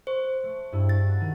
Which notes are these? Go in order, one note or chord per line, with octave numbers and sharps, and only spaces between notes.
C5 C#6
A3
G2 E4
A6
F#4
D#3